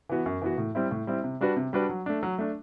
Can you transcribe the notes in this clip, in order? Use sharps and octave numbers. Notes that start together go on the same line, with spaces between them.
E3 B3 F#4
F#2
E3 B3 F#4
A2
G3 C4 E4
A2
G3 C4 E4
C3
G3 D4 F#4 B4
C3
G3 D4 F#4 B4
F#3
A3 D4
F#3
A3 D4